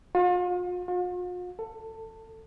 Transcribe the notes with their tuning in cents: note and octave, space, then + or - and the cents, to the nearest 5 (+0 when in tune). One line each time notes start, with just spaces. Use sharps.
F4 +40
F4 +45
A4 +20